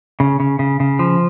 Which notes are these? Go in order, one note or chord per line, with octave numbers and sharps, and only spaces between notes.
C#3
C#3
C#3
C#3
F3